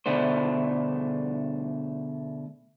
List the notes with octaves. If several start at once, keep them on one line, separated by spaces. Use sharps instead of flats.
D2 B2 D3 A3 D4 C5